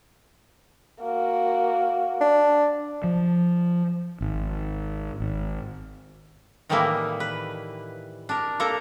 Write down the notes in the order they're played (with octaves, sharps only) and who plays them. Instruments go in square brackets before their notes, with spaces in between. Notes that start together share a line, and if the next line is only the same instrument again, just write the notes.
[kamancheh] A#3 F#4
[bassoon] D4
[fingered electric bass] F3
G#1
G#1
[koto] A2 D#3 E3 G3 A#3 E4
B4
D4 A#4
A#3 A4 A#4 A#5